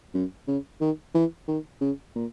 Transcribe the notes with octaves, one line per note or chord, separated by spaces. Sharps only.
F#2
C#3
D#3
E3
D#3
C#3
A#2